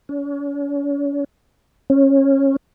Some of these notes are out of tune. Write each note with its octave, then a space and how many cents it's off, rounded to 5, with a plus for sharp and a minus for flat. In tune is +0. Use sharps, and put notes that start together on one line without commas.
C#4 +40
C#4 -20